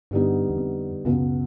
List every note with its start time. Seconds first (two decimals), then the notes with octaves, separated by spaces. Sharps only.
0.11 G2 D3 G3 B3 D#4
0.50 E2
0.58 F2
1.05 C#2 F#2 B2 F#3